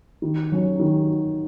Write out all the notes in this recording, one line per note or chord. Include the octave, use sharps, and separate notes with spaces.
D#3
F#3 C#4
D#3